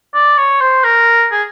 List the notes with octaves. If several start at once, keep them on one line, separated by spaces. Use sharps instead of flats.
D5
C#5
C5
A#4
G#4